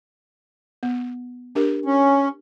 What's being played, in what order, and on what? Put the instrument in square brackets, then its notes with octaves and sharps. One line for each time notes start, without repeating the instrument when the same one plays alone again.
[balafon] B3
D4 G4 A#4
[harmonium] C#4